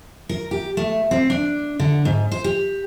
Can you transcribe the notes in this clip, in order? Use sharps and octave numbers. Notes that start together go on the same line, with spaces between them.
A#4
G4
A3
C4
D4
D3
G#2
C5
G4